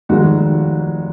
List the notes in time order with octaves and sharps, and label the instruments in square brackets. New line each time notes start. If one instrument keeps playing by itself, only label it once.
[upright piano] F1 D#2 D#3 G#3 F#4